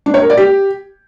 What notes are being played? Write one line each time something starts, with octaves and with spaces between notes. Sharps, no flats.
D4
C#5
A#4
D5
G4